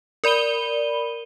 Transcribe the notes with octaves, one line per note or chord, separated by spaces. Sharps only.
A#4 D5 B5 D#7 G7